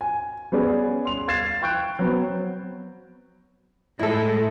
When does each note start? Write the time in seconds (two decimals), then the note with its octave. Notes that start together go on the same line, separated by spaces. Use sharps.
0.01 G#5
0.52 G3 B3 C#4 G#4 D5
1.05 C6 F7
1.28 F5 G#6 A6 C7 E7
1.62 G5 C#6 F#6 G6 D7
1.99 F#3 B3 C4
3.99 A2 G#3 E4 A4